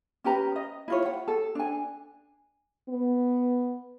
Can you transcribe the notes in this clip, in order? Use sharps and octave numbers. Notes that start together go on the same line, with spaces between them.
C#4 G4 B4 A#5
D#5
E4 F4 C#5
F#5
A4
D4 G#5
B3